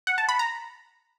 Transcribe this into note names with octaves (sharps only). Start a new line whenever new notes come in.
F#5
A5
B5
A#5